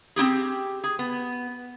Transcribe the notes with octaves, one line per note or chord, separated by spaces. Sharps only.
C4 E4 G4 G#4
G#4
B3